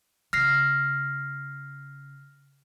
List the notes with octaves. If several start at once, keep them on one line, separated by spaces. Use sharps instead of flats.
C#3 F6 A#6 C7